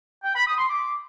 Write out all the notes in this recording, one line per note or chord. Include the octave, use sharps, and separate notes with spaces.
G5
B5
D#6
C6
D6